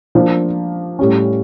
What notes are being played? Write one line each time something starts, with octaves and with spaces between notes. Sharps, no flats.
F3 A#3 D4
A2 G3 C#4